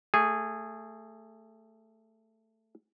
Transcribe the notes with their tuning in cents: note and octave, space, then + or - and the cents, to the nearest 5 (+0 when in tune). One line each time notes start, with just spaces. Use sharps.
A3 +10 G#4 -10